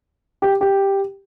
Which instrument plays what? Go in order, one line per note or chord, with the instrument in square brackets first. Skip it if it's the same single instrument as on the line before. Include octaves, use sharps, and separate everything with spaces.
[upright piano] G4
G4